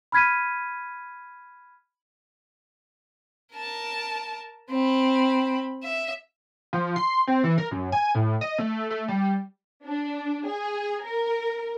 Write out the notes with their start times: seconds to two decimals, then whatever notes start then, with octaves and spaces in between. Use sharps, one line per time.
0.12 B5 F6 G#6 B6 D#7
3.54 A#4 A5
4.70 C4 B5
5.84 E5
6.73 F3
6.96 C6
7.27 C4
7.43 E3
7.58 A#4
7.71 F#2
7.92 G#5
8.15 A2
8.41 D#5
8.59 A3
8.90 A3
9.08 G3
9.86 D4
10.46 G#4
11.03 A#4